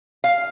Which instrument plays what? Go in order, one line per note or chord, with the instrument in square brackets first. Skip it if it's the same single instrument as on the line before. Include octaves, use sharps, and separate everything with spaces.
[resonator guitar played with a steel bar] F5